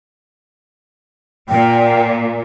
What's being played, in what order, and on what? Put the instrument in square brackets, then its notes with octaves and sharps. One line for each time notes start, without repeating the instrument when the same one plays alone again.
[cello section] A#2 [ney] G5